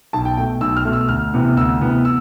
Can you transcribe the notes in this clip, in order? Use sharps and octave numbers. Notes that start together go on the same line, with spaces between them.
B1 A5
G5
B2 A3 G5
B1 E6
F6
B2 A3
E6
D2 F6
C3 E3 B3
D2 E6
C3 E3 B3
E6